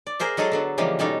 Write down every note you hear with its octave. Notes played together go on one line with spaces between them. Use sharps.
D5
G#4 A#4 C5 E5
F#3 G#3 G#4 A4 D#5
D3 F#3 B3
C#3 E3 F3 G3 G#3 A#3
B2 G3 C#4 D#4 A4